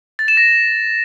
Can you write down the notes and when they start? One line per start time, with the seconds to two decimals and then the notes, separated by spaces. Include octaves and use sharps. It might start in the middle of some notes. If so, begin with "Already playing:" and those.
0.19 A6
0.28 E7
0.37 A#6